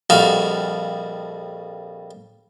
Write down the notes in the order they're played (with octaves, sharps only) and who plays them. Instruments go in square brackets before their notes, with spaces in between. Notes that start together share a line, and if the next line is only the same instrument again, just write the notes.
[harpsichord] A#1 F2 G3 F#4 F5